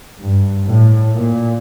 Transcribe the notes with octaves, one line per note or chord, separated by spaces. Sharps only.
G2
A2
A#2